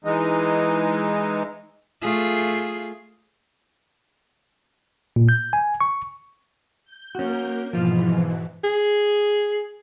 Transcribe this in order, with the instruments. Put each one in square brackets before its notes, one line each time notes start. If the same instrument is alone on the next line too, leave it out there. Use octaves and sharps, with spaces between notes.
[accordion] E3 G#3 D#4
[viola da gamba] A3 F4 G#4
[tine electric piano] A#2
G6
G#5
C#6
[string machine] G6
[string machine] A#3 A#4 G6 [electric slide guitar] C#4 F#4
[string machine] G#2 B2 E3 [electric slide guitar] F3 F4
[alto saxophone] G#4